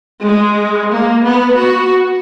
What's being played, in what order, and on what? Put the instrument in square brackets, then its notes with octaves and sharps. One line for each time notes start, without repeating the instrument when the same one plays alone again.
[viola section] G#3
A#3
B3
F#4